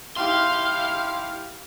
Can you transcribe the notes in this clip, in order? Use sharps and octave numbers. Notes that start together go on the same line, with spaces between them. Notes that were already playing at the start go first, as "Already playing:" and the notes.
E4 G4 F5 C6